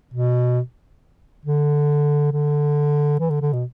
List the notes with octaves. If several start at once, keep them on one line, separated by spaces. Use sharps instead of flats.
B2
D3
D3
E3
D3
D3
B2